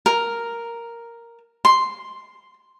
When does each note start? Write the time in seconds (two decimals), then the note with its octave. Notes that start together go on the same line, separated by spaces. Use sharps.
0.06 A#4
1.65 C6